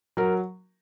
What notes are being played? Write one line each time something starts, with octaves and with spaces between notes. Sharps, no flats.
F#3 A#4